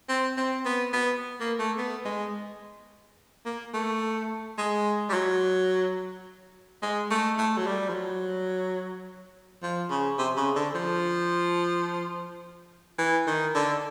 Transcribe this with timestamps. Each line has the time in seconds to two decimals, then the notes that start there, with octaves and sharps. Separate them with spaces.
0.09 C4
0.37 C4
0.65 B3
0.93 B3
1.40 A#3
1.59 A3
1.78 B3
2.05 G#3
3.45 A#3
3.74 A3
4.58 G#3
5.09 G3
5.14 F#3
6.82 G#3
7.10 A3
7.38 A3
7.57 F#3
7.66 G3
7.89 F3
7.94 F#3
9.63 F3
9.90 C#3
10.18 C3
10.37 C#3
10.56 D3
10.75 F3
12.98 E3
13.27 D#3
13.55 D3